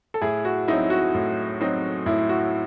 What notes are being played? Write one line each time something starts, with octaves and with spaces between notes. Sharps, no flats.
A4
A2 E4 G#4
F#4
F#3 C4 D#4 E4
F#4
A2
F#3 C4 D#4
A2 E4
F#4